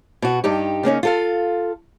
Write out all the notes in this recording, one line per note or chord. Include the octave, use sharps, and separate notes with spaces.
B2 F#4
G2 D#4 G4
C#3 A#3 C#4 D#4
F4 A4 F5